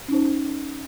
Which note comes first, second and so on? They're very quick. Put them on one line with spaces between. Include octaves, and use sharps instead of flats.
C#4 D#4 C5